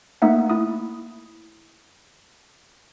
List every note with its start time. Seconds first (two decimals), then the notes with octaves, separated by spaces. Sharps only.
0.22 A3 A#3 D#4 E5 F#5
0.50 E4 D#6